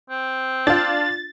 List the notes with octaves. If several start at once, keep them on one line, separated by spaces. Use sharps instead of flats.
C4
D4 F4 A6